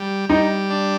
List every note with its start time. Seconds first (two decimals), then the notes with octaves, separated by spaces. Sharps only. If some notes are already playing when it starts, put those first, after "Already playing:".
Already playing: G3
0.29 G3 D#4
0.70 D4